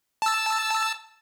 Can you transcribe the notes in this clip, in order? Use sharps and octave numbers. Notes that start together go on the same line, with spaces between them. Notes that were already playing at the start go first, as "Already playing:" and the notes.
A5 E6